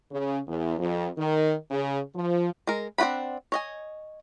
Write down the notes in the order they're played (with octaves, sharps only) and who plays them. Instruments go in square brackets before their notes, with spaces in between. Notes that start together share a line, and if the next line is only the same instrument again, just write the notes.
[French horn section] C#3
E2
F2
D#3
C#3
F3
[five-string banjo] G#3 A#4
C4 D4 F4 F#5 B5
C#5 D#5 G#5